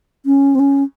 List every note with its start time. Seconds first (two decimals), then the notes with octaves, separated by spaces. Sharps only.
0.26 C#4
0.55 C4
0.59 C#4